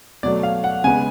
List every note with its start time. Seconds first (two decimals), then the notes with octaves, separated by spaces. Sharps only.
0.23 B2 F#3 A3 D5
0.43 F5
0.64 F#5
0.84 C#3 G#3 B3 G#5